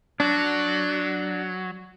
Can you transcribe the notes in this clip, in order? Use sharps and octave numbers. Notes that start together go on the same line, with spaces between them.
F#3 D4